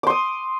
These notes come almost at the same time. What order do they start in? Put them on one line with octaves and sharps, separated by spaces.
D6 C6 D#6